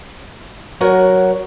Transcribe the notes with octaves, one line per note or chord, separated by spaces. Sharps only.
F#3 A#4 C#5 F#5 A#5